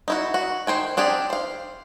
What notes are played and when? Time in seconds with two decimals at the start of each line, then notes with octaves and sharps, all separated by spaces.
0.08 D#4 E4 F#4
0.34 F#4
0.67 D#3 C5 G5 G#5
0.97 C4 D4 G4 G#4
1.30 C5 F5